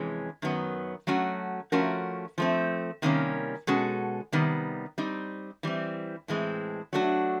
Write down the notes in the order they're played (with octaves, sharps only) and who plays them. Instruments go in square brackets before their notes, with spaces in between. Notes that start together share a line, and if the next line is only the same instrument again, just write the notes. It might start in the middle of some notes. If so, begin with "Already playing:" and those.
Already playing: [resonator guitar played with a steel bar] F2 C3 E3 G#3 C#4
F#2 D#3 F#3 B3
F#3 A3 C#4 F#4
F3 A3 C#4 F#4 A#4
F3 A3 C4
C3 D#3 G3 A#3 C#4
B2 G#3 C#4 F#4 A4
C3 D#3 G3 B3
G3 C4 D#4
E3 G3 C4
A2 E3 G#3 C4
F#3 A3 D4 F#4